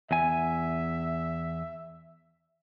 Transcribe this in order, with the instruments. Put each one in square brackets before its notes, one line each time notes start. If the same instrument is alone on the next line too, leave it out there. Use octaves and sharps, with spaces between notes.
[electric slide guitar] E2 G#5 [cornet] E5